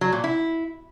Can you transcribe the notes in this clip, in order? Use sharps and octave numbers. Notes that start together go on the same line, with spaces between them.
F#3
A#2
E4